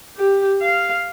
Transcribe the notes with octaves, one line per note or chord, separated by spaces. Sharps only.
G4
F5